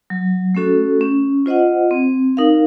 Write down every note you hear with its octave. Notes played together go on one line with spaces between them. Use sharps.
F#3
A3 C#4 F#4 A4
C#4
F4 C5 D#5 F#5
C4
D#4 A#4 F5